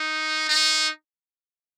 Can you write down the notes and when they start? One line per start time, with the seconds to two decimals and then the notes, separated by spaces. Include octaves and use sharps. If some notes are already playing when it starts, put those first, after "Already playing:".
Already playing: D#4
0.49 D#4